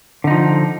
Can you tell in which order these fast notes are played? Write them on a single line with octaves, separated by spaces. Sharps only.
D3 D#4 F3